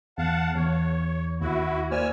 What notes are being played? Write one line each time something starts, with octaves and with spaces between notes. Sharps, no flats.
E2 F5 F#5 A5
E2 C#5
D#2 E4 F#4
A#3 C5 D5 G#5 E6 F6